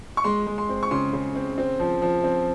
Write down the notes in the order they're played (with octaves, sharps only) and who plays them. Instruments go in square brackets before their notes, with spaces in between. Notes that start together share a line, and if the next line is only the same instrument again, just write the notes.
[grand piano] C#6
G#3 C6
G#3
C6
C4
C#6
C#3 C6
C#3
C4
C4
F3
F3
C4